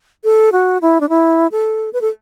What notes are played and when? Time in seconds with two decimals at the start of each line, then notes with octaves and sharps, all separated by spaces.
0.24 A4
0.52 F#4
0.82 E4
1.01 D4
1.09 E4
1.52 A4
1.93 B4
2.01 A4